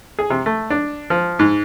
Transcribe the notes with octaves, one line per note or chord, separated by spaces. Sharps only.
G#4
C3
A3
D4
F3
G#2